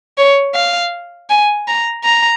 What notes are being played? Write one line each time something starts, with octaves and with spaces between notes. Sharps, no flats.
C#5
F5
G#5
A#5
A#5